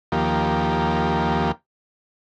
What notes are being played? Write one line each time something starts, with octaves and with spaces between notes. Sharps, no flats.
D#2 F3 A#3 G4